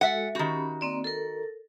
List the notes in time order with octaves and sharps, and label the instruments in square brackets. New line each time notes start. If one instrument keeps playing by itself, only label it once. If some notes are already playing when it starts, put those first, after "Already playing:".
[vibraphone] G#3 F#4 A4 [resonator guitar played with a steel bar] E5 F#5
[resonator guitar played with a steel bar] D#3 F#4 [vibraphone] C#4 G4 B5
[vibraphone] A#3 C4 D5
A4 A#4